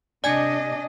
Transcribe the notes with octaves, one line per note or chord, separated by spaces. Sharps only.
C3 D4 D5 D#5 G#5 G#6